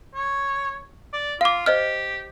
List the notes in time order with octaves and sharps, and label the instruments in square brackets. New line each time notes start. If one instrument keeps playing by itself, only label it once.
[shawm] C#5
D5
[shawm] F4 [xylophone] F5 D6
[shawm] G4 [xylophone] C5 D#5 F6